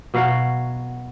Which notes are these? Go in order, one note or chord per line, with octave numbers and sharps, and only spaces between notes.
B2 F#3 F5 F#5